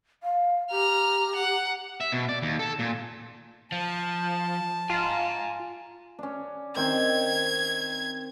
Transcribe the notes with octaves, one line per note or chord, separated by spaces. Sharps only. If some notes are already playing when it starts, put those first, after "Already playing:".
F5
G4 A#5 F6
F#5
E5
B2
D5
D#2
A4
A#2
F3 A5
F4 G#5 A#5
C#4 D4
D#3 C4 G5 G#6